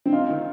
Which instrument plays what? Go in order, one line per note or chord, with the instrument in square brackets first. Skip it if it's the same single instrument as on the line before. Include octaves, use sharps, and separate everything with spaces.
[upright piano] C4
[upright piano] D#4 [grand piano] F4
[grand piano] D#3